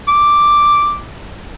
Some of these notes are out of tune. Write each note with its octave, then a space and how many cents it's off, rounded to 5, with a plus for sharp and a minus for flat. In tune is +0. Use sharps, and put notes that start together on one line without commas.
D6 +0